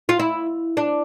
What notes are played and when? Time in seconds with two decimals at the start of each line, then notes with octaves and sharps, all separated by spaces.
0.09 F4
0.19 E4
0.77 D4